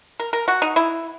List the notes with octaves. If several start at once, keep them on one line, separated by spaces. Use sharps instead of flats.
A#4
A#4
F#4
D#4
E4